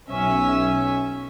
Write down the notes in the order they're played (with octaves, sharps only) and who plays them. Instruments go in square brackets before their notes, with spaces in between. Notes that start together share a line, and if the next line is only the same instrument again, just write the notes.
[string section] B1 C#4 E5